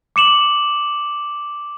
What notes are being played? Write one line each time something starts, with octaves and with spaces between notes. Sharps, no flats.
D6 C#7 E7 F#7